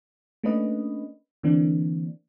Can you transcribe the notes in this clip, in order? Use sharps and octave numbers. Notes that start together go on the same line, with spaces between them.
A3 A#3 C#4 D4 B4 D#5
D3 E3 A#3 C4 D4